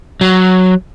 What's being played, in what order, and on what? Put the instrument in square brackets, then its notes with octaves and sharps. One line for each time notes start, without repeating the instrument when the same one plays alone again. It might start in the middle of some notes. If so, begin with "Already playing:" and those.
[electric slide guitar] F#3